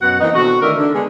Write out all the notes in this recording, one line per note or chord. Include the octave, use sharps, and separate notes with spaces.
F#2 B2 B3 F#4 F#5
E3 A#3 C4 D#4
B2 D3 C4 F#4
D#3 E3 A3 D4 A#4 E5
D3
D3 G#3 B3 G#4